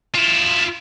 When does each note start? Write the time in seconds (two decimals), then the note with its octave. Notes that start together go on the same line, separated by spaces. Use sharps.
0.15 E4 F4